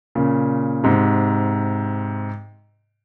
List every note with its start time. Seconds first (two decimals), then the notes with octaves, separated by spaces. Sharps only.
0.15 A#2 C#3
0.84 G#2 C3